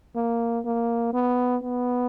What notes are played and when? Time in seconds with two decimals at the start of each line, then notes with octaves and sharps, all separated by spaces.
0.16 A#3
0.65 A#3
1.13 B3
1.62 B3